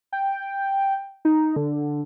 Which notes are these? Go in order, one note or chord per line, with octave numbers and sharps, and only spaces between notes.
G5
D#4
D3